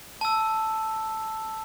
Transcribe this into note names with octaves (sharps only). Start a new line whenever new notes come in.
A5 E6